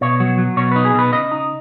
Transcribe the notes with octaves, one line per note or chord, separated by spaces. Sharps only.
B2 C#5
F#3
F#3
B2 C#5
D#4 B4
G#4
B2 B4
C#3 D#5
D#4